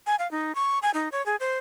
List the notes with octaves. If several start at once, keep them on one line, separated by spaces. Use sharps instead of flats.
G#5
F5
D#4
C#6
G#5
D#4
C#5
G#4
C5